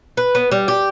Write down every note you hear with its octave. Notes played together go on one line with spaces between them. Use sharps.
B4
B3
G3
G4